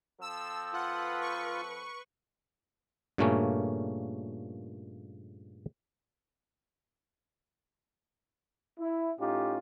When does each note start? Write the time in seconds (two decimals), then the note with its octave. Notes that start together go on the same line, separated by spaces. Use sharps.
0.22 F3 C4 A4 E6
0.74 F4 B4 F#5
1.21 C#6
3.18 G2 A#2 C#3 A3 A#3 C#4
8.78 E4
9.19 A2 C#4 D#4 F4 G4